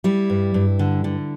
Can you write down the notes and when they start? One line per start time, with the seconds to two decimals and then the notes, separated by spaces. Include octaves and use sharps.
0.04 G3 E4
0.30 G2
0.54 G2
0.79 D3
1.04 D3